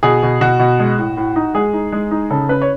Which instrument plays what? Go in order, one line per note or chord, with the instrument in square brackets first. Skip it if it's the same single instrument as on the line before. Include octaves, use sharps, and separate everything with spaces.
[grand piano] B2 G#4
B2
B2 F#4
B2
G#3
A2
A2
D#4
G#3 G#4
D#4
G#3
D#4
C#3 A4
C#4 B4
C#5